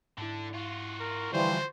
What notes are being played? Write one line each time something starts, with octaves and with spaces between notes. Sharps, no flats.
G#2 D3 D4 E4
F4 F#4
A#4
D3 E3 F3 G3 C5